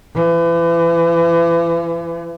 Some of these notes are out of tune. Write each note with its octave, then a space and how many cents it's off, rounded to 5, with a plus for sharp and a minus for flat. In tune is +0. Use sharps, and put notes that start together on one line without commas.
E3 +35